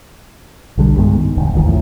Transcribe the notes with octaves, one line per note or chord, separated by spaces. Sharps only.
B1 D3 G3
G2 D#3 G#3 B3
D#3
E1 D2
G#1 D2 D#3 F3
F#2 A2